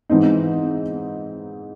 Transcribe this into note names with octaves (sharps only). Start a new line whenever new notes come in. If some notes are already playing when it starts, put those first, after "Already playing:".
G#2 E3 C4 D#4